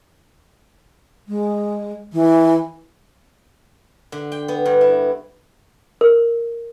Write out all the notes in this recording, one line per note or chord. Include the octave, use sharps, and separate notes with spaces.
G#3
E3
D3
G5
B3
G2
E4
A#4